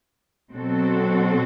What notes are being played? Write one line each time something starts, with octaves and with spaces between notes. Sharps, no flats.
B2 F#3 C4 F#4 A4